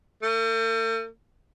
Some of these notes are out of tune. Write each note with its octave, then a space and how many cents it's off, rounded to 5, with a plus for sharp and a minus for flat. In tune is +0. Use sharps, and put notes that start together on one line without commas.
A3 +45